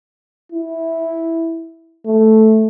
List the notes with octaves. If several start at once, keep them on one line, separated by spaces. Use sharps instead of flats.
E4
A3